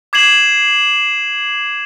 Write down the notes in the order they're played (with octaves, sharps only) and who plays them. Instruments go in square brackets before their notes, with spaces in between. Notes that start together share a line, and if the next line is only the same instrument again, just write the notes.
[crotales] D6 G#6 C7 E7 F#7